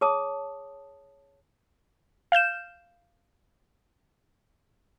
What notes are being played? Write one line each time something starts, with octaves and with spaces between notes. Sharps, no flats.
G#4 C#5 A5 D#6
F5 F6 G6 E7